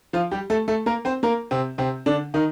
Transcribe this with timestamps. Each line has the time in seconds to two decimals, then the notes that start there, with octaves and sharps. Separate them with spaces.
0.13 F3 F4
0.31 G3 G4
0.50 A3 A4
0.68 A3 A4
0.86 A#3 A#4
1.05 C4 C5
1.23 A#3 A#4
1.51 C3 C4
1.78 C3 C4
2.06 D3 D4
2.34 D#3 D#4